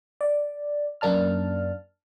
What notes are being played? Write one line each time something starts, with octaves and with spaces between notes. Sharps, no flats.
D5
F#2 A#3 D4 A5 F6